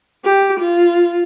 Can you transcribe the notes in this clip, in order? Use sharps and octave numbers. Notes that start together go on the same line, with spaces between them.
G4
F4